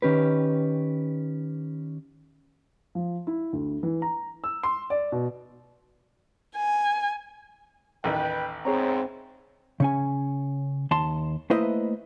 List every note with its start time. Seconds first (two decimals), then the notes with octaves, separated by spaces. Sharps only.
0.02 D#3 C#4 G4 B4
2.95 F3
3.27 E4
3.53 D2
3.83 E3
4.02 A#5
4.44 E6
4.63 C6
4.90 D5
5.12 B2
6.56 G#5
8.04 A1 D#2 B4 G5
8.65 E2 G#2 C4 G#4 C#5 A#5
9.80 C#3 C#4 G#5
10.91 D#2 A5 C6
11.50 A3 A#3 E4 B4 C5 D#5